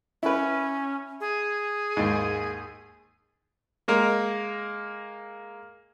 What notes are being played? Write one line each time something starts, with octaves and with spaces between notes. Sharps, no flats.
C#4 E4 B4
G#4
D#2 G#2
G#3 A#3 A#4